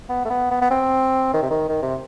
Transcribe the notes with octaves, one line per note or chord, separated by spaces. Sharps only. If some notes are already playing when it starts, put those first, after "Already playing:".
B3
A3
B3
B3
B3
C4
D#3
C3
D#3
D#3
C3